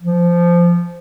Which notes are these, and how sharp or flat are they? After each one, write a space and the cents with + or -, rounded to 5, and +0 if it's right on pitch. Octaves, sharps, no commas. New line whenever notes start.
F3 -15